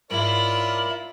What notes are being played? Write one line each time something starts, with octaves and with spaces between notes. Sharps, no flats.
G#2 E4 F4 A#4 C#5 D5 F#7